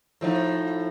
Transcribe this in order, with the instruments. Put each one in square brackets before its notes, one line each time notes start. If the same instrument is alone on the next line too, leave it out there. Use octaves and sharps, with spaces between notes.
[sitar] A2 F3 D#4